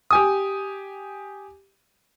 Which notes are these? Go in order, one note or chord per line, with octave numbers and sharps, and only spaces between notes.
G4 G#5 D#6